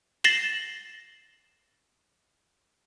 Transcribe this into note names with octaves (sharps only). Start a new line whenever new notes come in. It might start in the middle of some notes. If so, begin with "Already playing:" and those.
A6 A#6 C7 E7 F#7 G7